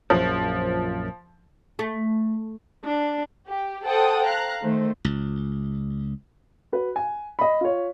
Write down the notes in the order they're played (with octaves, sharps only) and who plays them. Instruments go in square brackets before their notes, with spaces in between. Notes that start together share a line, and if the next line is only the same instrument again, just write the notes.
[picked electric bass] A#1 F#2 [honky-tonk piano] F3
[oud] A3
[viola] D4
[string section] G4
A4 C5 F#5 G5 A5 D#6
F5 A#5 F#6
D#3 A3 C5
[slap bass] C#2
[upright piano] F#4 B4
G#5
D#5 B5
F4 C#5